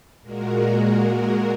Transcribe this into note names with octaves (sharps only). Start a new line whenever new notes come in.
A#2 G#3 F#4 A#4